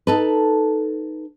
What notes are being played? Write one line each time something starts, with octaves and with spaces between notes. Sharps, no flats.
D#4 A4 B4